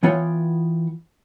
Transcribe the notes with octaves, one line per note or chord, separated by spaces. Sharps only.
E3 B3 F4 C#5 F#5 G5